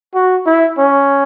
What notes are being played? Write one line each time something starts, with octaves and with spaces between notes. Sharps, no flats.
F#4
E4
C#4